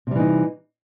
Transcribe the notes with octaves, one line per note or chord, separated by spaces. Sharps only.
C3 E3 G3 D#4